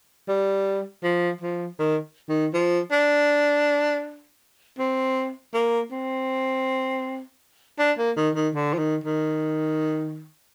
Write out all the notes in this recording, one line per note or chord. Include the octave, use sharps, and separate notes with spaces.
G3
F3
F3
D#3
D#3
F3
D4
C4
A#3
C4
D4
A#3
D#3
D#3
D3
F3
D#3
D#3